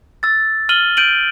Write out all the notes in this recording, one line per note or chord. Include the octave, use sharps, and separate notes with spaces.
E6 A6
F6 D#7 F#7 G7
G6 D7 D#7 F#7